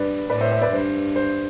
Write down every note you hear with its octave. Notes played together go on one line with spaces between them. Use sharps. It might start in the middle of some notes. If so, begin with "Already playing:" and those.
Already playing: G2 B4 D5
A2 B4 D5
C5 E5
C5 E5
B4 D5
G2 C5
C5